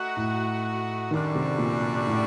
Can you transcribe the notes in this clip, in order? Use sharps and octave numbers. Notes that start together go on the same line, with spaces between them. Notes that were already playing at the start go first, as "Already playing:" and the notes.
Already playing: A3 D#4 F#4
A2
F#2 D3 D#3 G3 D4 F#4
C3
A#2
A2